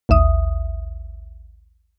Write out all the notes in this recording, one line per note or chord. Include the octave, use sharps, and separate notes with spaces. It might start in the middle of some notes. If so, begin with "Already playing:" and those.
A1 D#2 E5 D#6